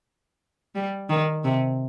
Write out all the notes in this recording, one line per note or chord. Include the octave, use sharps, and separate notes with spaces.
G3
D#3
C3